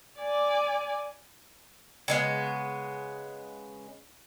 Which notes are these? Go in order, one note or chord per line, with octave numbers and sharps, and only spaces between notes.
D5 G#5
C#3 G#3 B3